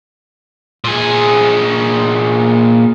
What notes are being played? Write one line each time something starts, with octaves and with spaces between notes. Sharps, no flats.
A#2 G#4